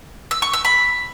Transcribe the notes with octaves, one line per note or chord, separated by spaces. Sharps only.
E6
C#6
E6
B5